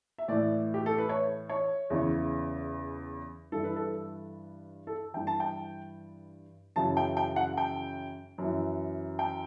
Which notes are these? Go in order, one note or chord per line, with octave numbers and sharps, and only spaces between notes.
E5
A2 E3 D5
G4
A4
B4
C#5
C#5
E2 C#3 E3
G2 E3 A4
B4
A4
A4
G2 E3 G5
A5
G5
F#2 C#3 E3 A5
G5
G5
F#5
G5
F#2 E3
G5